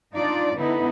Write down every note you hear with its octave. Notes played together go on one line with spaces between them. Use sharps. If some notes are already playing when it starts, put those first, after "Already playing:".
D4 D#4 F4 D5
D3 B3 D#4 E4